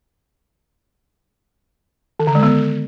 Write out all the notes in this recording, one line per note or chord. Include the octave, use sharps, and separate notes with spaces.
D#3
D3
G#3
B3